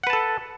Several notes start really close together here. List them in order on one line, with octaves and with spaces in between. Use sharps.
F#5 B4 A5 A4